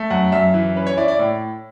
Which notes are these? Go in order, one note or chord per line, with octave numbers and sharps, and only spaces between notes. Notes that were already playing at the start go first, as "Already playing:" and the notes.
Already playing: A3
F#2 F#5
F#2 E5
E3
C#4 B4
C#5
E4 D5
D5
A2